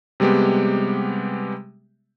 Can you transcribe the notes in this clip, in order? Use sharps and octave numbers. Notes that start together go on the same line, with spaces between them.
C3 G3 G#3 B3 G4